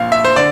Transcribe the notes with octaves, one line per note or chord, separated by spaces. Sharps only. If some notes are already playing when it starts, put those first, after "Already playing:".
Already playing: A#1 A#2 F5
E5
C5
D3 D5